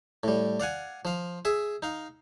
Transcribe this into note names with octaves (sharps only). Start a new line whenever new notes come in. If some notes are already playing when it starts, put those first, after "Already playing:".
A2 G3
D5 F5 F#5 G#5
F3 F5
G#4 E5
D#4 F5